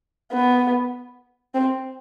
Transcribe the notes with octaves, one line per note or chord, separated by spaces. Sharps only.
B3
C4